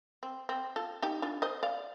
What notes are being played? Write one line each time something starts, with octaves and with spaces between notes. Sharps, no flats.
C4
C4
F4 A4
D#4 G4
D4 F4
C5 D#5
D5 F5